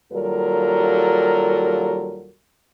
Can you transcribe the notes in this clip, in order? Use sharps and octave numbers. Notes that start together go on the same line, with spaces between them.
D#2 F#3 G3 F4 A4 A#4